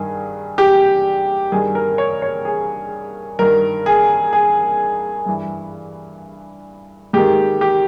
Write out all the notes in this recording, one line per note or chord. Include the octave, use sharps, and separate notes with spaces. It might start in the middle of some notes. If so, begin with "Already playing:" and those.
Already playing: G2 D#3 G#4
G4
G2 D#3 G#4
A#4
C#5
C#5
G#4
G2 D#3 A#4
G#4
G#4
G2 E3
G#2 D#3 G4
G4